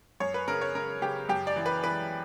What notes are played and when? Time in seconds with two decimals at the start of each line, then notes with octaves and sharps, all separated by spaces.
0.20 F#2 C#5
0.34 B4
0.48 C#3 A#4
0.61 C#5
0.75 C#3 A#4
1.02 C#3 G4
1.29 F#2 G4
1.47 D5
1.56 E3
1.66 B4
1.83 E3 B4